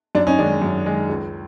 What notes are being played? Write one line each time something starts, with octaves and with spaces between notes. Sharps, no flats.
F#2 D4
C#4 D#4
D#3 G#3 D4
F#2
D#3 G#3
C#2